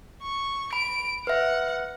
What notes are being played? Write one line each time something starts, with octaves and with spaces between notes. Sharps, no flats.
C#6
B5 D7
B4 E5 F#5